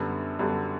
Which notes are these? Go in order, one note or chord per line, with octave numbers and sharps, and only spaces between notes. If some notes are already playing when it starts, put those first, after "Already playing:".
Already playing: F#2 D3 G3 B3
F#2 D3 G3 B3